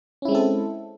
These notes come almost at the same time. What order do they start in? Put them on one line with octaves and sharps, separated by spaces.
C#4 E4 G#3 C4 A4